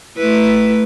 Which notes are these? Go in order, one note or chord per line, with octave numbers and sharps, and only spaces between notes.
A3 E4 B4